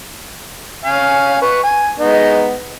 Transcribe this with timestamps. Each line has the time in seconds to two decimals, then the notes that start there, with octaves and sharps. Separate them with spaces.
0.85 C#4 F5 G#5
1.42 B4 C#6
1.63 G#5
1.99 G#3 B3 D#4